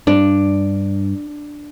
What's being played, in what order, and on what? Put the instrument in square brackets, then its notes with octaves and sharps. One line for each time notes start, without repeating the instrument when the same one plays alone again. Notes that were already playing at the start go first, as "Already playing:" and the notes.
[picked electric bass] G2 [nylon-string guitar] D4